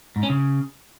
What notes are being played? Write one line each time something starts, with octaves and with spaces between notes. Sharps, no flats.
G#2
C#4
C#3